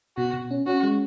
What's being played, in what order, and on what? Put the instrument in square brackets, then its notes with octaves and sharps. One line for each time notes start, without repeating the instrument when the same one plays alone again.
[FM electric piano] B2 [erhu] F#4
[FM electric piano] B2
C#4
[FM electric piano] C#4 [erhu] F#4
[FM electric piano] G#3